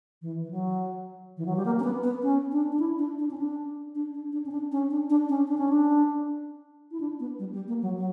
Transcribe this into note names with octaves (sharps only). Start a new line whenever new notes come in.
E3
E3
F#3
E3
F#3
G3
A#3
C#4
B3
B3
C#4
D4
D4
E4
D4
D4
C#4
D4
D4
D4
D4
C#4
D4
C#4
D4
D4
C#4
D4
C#4
D4
E4
D4
B3
G3
G3
A#3
F#3
F#3